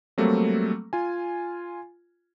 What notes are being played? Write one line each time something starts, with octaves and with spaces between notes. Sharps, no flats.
F#3 G3 A3 A#3 C4
F4 G#5